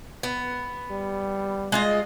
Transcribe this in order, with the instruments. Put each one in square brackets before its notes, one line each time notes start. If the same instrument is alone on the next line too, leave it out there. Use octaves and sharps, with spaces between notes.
[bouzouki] B3
[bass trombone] G3
[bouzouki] G#3 F4 D#5